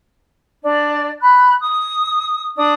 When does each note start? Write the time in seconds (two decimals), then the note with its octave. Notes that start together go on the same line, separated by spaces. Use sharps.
0.62 D4 D5
1.21 B5 F#6
1.60 D#6
2.55 D4 D#6